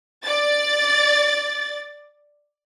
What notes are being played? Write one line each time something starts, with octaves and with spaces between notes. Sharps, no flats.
D5 A6